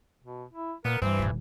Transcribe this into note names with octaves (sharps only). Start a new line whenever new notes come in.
B2
E4
A#2 B3 A#4
G2 E3 G3 C4
D#1 D3